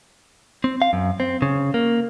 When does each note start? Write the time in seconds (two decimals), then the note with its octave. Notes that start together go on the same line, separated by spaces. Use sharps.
0.64 C4
0.82 F5
0.93 F#2
1.20 C4
1.42 C#3
1.74 A#3